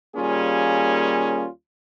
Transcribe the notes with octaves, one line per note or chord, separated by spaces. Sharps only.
D#2 G3 A#3 C#4 F4 G#4